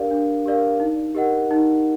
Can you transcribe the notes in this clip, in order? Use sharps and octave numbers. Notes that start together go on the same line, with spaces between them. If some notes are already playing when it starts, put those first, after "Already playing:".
Already playing: D4 G4 A#4 D5 F5
D4
G4 A#4 D5 F5
D#4
G4 A#4 D#5 F#5
D#4